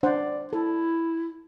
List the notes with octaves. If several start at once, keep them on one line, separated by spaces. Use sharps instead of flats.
D4 C5 D5 F#5
E4 A4